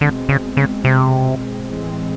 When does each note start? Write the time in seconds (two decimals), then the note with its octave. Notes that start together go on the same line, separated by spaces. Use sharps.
0.01 B2 D3 G#3 C4
0.29 C#3
0.57 C#3
0.85 C3
1.68 A2 E3 G#3 C4